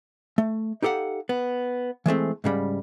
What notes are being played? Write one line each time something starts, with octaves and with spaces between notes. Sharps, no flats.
A3
D#4 G4 A4 F5 F#5
B3
E3 G#3 A3 C4
G#2 C#3 G3